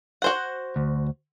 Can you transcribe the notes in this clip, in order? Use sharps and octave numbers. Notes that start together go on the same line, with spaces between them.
F#4 C5 F#5
D2